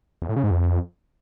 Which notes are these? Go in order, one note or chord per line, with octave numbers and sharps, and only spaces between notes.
E2
A2
C#3
G#2
F2